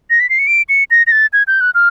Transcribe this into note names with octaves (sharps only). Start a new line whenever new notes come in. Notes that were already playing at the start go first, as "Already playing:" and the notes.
A#6
B6
C7
C#7
D7
C#7
A#6
A#6
A6
G#6
G6
F#6
F6